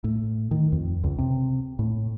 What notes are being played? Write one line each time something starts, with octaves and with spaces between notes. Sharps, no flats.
A2
D#3
F2
C#2
C3
A2